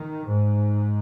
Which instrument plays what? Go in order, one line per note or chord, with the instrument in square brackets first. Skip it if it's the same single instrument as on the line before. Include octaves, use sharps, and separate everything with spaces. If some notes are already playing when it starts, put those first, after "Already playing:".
Already playing: [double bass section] D#3
G#2